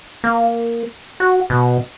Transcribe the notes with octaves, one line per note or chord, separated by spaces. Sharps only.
A#3
F#4
B2